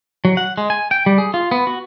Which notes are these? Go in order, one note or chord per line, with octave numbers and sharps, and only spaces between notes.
F#3
F#5
G#3
G#5
G5
G3
G#4
F4
B3
F#4